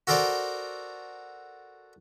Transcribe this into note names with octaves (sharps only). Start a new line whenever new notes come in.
F#4 A4 A#4 C5 D5 D6